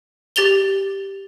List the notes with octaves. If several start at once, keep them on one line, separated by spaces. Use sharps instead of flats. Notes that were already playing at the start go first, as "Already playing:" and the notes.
G4 A6 F7 G7